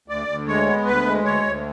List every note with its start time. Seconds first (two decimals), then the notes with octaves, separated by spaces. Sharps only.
0.08 D2 D5
0.27 D2
0.47 G#3 C#5
0.67 B3
0.86 D2 B4
1.06 G#3
1.24 D2 C#5
1.44 D2